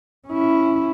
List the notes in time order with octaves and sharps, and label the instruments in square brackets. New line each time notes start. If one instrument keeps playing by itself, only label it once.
[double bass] C#4 E4